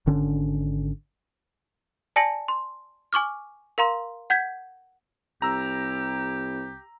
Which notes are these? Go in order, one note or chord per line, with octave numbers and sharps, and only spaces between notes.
G#1 D3 C#4 D4
D5 G#5 A5 A#6 C#7 F#7
C6
G#5 C#6 D6 F6
A#4 F5 A#5 C6
F#5 G6 G#6 B6
C2 G4 A#5 E6